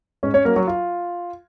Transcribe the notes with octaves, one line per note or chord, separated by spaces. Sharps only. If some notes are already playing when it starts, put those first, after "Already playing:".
G#2 C#4 C#5
C#4 C#5
F#3 A#3 C#4 A#4
F#3 F#4
F4